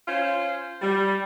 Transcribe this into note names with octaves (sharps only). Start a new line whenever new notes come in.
C#4 F4 C5
G3